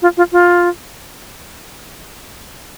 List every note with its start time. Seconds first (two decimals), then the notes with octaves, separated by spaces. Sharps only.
0.02 F4
0.17 F4
0.32 F4